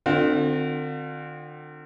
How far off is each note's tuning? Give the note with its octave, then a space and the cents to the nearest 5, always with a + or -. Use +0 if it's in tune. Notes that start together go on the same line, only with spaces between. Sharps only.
D3 +35 C4 +0 F4 +40